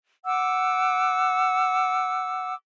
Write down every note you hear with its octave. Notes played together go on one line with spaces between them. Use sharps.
F#5 D6 E6